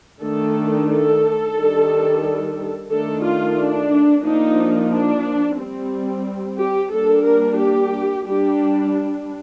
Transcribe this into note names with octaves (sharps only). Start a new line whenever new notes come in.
D#3 A3 D4 A4
A4
D#3 G3 D4
D#3 A3 D4 A4
F4
D4
F3 A#3 D4 D#4
D4
G3 C4
G4
G3 A#3 D4 A4
A#4
G4
G3 D4 G4